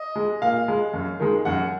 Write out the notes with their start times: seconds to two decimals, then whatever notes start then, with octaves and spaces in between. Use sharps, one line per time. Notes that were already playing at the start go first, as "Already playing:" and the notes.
Already playing: D#5
0.16 G#3
0.42 A#2 F5
0.68 G#3
0.94 F#2
1.20 D#3 G#3
1.45 F#2 F#5